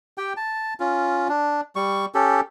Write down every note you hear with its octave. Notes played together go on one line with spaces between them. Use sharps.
G4 G5
A5
C#4 F4
D4
G3 C#6
C#4 G4 A4